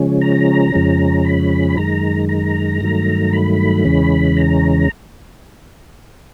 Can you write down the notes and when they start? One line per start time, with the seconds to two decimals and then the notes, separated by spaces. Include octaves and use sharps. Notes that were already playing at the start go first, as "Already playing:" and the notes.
Already playing: C#3 F3 G#3 C#4
0.21 A#5
0.72 F2 C#3 F3 G#3 C#4
1.25 B5
1.76 F#2 D#3 G#3 A#5
2.29 A#5
2.81 G2 D#3 F#3 A3
3.33 B5
3.85 E2 C#3 E3 G#3 C#4
4.37 A#5